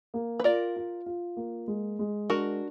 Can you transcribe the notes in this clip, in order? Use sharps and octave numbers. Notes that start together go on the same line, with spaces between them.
A#3
B4
F4 A#4 D5
F4
F4
A#3
G#3
G#3
D4 F#4 A#4